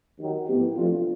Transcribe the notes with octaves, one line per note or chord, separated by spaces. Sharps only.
D#2 D#3 F#3
A2 F#3 B3 E4 G4
C3 F3 A3 D4 F4